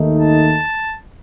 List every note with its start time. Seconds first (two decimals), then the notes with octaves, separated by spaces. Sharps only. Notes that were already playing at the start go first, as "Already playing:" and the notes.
Already playing: D#2 D#3 A3 D#4
0.20 A5